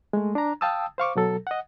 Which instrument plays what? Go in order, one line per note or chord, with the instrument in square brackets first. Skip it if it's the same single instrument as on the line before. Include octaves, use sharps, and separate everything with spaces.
[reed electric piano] G#3 A3
D4 A#5
F5 G5 A5 D#6 E6
C5 F5 C#6 D6
B2 F#3 A4
D#5 F#5